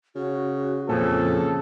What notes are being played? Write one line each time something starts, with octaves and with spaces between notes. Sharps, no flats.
C#3 F#4
F2 A#2 C#3 A4 C5